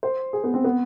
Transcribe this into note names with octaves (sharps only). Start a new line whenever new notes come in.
C5
G#4
B3
C4
B3